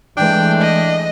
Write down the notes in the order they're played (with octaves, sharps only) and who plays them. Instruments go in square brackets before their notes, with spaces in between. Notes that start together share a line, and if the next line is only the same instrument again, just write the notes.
[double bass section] E3 G#3 A3 [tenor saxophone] D4 [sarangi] G5
[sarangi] D#5